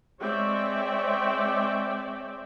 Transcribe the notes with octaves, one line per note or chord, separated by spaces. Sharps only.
G#3 C4 C#5 D5 E5 G5